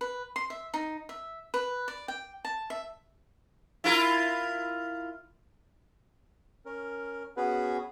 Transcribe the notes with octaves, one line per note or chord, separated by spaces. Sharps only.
B4
C6
E5
D#4
E5
B4
D5
G5
A5
E5
E4 F4 A#4
C#4 A#4
B3 C#4 F#4 G#4 B4